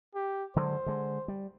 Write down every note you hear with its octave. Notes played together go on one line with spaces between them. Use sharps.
G4
D3 F#3 G#3 C5
D3 G#3
G3